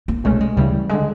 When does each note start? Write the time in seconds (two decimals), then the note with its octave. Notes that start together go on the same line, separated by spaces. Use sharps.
0.08 A#3
0.24 C2 B2 G#3 A3 C#4
0.40 G#3
0.57 D2 C#3 E3 G3
0.89 D3 G#3